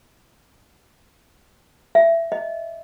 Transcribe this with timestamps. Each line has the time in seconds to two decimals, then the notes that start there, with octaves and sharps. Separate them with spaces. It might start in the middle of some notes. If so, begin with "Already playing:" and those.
1.95 E5
2.32 D#5